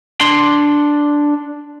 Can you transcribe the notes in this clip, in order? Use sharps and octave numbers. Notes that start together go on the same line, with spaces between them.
D4 C6